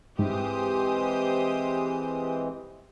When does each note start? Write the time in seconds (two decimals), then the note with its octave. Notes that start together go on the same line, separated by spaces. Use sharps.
0.19 G#2 E3 G#3 C4 G4 C5 D#6